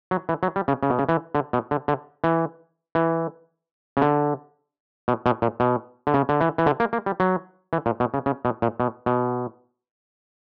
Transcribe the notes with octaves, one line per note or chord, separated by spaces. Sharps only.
F#3
E3
F#3
G3
C#3
C#3
B2
C#3
E3
D3
B2
D3
D3
E3
E3
C#3
D3
B2
B2
A#2
B2
D3
C#3
D3
E3
E3
D3
A#3
A#3
G3
F#3
E3
A#2
B2
C#3
C#3
B2
A#2
B2
B2